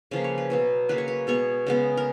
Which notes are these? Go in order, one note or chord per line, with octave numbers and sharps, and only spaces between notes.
C#3 F3 A#3 B4
C#5
B4
B2 F#3 B3
C#3 F#3 A#3 B4
C#5
B4
B2 G#3 B3 C#5
C#3 G#3 B3
A#4